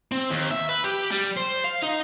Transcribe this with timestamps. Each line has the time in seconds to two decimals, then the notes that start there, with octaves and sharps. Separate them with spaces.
0.12 C4
0.30 D#2
0.51 E5
0.69 B4
0.84 G4
1.12 G3
1.37 C5
1.64 F5
1.82 D#4